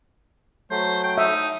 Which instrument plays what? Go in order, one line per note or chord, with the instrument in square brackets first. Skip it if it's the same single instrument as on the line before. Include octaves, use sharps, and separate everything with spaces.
[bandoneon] F#3 A3 [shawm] C5
[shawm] G5
[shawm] D#4 [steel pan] E5